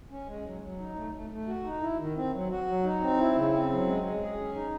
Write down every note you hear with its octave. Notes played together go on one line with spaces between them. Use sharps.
C#4
G#3
F#3
F#3
D#4
A3
A3
A3
F#4
D#4
E4
D#3
C4
F#3
F#4
F#3
D#4
C4
E4
C#3
C4
F#3
G#3
G#3
G#4
C#4
D#4